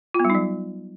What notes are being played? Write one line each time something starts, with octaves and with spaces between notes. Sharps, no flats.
F4
B3
G3
D#4
F#3